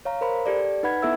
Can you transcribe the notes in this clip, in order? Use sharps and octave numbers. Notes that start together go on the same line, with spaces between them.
C#5 F5 A#5
A#4 C5 B5
G4 A4 D5
D#4 B4 F#5 B5 G#6
B3 E4 A4 E5 E6 G#6